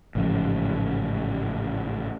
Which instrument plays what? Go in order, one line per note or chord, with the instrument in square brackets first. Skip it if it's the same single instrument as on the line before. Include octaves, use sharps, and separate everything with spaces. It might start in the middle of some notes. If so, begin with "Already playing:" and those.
[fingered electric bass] A1 G#2 C#3 F3